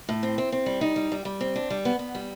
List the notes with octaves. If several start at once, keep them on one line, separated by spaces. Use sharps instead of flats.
A2
C4
C4
C4
G3
D#4
G3
G3
G3
C4
D4
G3
B3
B3
G3